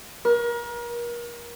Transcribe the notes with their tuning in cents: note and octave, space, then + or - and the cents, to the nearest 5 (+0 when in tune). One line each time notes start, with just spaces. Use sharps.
A#4 +35